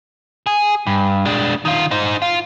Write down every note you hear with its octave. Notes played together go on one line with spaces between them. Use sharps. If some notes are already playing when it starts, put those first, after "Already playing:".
G#4
G2
G#3 D4
D#3 F4
D#4 C5
F4